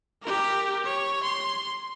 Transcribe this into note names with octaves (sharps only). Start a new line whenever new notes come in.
G4 A#4
C#5
C6